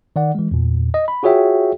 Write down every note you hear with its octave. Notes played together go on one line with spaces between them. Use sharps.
D#3 D5 F#5
E3 G#3
E2 A#2
D#5
B5
F4 F#4 G#4 C#5 E5 G5